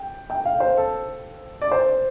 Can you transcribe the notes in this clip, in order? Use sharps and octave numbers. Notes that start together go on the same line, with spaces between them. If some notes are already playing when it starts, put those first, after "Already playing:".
Already playing: G5
G5
F5
C5
A4
D5
C5